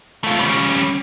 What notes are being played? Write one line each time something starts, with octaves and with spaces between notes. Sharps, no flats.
A3 F4
G3 C#4